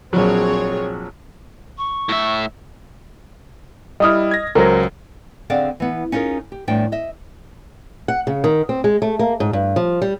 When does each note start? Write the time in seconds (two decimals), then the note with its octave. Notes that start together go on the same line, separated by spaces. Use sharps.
0.13 A#1 F#3 C4 G#4 C#5
1.78 C#6
2.09 A2 E5
4.00 G3 E4 D#5 D#6 F6
4.31 G#6 A#6
4.55 C#2 F#3 A#4 C5
5.50 D3 C4 G#4 D5 F5 F#5
5.80 E3 B3
6.12 C#4 D#4 F4 G#4 A#4
6.52 G4
6.67 E2 A2 G3 D4 G5
6.92 D#5 E5
8.08 F#5
8.27 C#3
8.44 D#3
8.69 C4
8.84 G#3
9.02 A3
9.19 A#3
9.40 G#2
9.53 G2
9.76 F3
10.02 G3